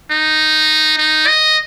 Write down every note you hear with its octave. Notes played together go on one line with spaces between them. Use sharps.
D#4
D#4
D#5